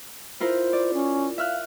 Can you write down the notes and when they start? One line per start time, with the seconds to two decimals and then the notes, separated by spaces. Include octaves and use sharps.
0.40 E4 F4 A#4 C5
0.73 D5
0.94 C#4
1.38 E5 F5 F6 F#6